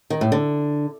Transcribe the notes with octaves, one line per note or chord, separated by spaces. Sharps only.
D#3
A2
D3